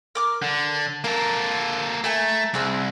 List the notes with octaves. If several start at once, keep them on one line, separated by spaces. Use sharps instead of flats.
A#4 D6 F6
D3
A#3 A4 A#4
A3 E4 A#4 G#5
C2 C4 G#4 E6